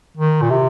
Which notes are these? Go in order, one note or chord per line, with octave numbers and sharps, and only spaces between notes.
D#3
A#2
C3